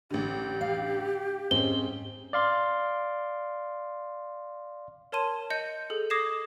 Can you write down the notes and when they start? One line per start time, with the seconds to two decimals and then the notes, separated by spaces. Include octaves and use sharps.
0.11 A1 D3 G4
0.61 F5
1.51 G#2 C4 C#4 G7
2.33 D5 F5 C6
5.12 A#4 C#5 A5 C6 D#7
5.50 D#5 G6 C#7
5.90 G#4 A4
6.10 D6 D#6 G#6 A#6 C7 E7